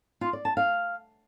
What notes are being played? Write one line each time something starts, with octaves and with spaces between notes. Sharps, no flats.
F4
D5
A5
F5